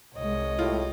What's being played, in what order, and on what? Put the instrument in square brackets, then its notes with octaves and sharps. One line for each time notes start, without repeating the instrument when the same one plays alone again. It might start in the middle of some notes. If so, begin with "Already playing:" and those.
[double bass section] C2 G#3 [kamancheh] C#5 D#5
[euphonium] A2 [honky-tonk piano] F4 G4